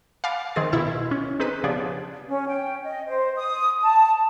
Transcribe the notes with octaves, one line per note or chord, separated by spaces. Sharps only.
F5 F#5 G#5 B5 D6 A6
D#3 C4 G#4 A6
B2 E4 C#6 E6
C#4
C4 D#4 G#4 B4 F#6 D#7
C#3 F3 B3 D4 G4 G#4
C#4
G5
D#5
C5
D#6
A5